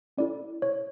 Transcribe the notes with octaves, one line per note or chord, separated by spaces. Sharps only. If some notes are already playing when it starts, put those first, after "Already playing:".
C#4 E4 A4 D5
C#5